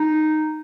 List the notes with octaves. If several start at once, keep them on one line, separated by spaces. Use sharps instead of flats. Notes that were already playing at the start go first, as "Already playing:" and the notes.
Already playing: D#4